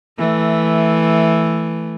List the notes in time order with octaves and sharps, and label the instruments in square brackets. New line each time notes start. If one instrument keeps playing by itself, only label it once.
[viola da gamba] E3 A3